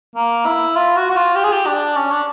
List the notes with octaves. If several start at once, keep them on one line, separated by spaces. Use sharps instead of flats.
A#3
E4
F4
F#4
F#4
F4
G4
G#4
G4
D4
C#4
D4